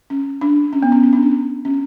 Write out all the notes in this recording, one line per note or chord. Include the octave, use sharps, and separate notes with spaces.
C#4
D4
C#4
B3
C#4
C#4
D4
C#4
C#4